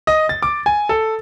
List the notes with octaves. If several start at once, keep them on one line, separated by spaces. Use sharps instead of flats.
D#5
A6
D6
G#5
A4